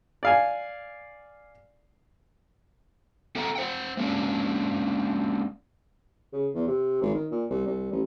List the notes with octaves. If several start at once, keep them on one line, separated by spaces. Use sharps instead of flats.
D5 F5 G#5
C4 A4 E5 F#5 A#5
C5 F#5 G5
G#3 A#3 C#4 D4
C#3
E2
C3
G#1
D#3
A#2
C2
C2
A1